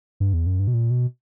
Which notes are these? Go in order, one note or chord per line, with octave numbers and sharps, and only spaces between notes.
G2
E2
F#2
G2
B2
A#2
B2